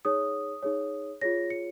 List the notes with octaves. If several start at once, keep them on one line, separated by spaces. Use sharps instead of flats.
D#4 G#4 C#5 D#6
D#4 G#4 C#5
F4 G#4 C#5 A#6
C#7